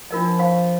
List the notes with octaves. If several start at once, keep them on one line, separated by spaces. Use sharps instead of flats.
F3 D4 F4 A#4 D#5
C5 F5 G#5 C#6